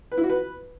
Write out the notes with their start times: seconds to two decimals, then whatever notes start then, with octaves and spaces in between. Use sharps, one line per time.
0.12 B4
0.18 E4
0.24 F#4
0.30 B4